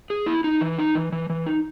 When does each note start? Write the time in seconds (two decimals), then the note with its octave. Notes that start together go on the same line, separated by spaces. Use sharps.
0.10 G#4
0.26 E4
0.44 D#4
0.61 E3
0.78 D#4
0.95 E3
1.12 E3
1.30 E3
1.46 D#4